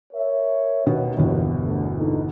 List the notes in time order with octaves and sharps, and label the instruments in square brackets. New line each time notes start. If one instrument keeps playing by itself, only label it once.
[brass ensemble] A#4 C#5 E5
[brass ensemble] D#2 [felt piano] B2 D#3 B3
[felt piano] G1 E2 B2
[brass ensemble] D2
A#2 D3 D#4